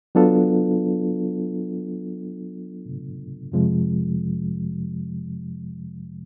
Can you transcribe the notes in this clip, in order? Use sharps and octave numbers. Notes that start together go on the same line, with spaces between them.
F#3 B3 D4 F4 A4
F2 C3 F3 G#3